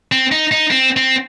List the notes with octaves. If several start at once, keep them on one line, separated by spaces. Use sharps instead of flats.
C4
D#4
D#4
C4
C4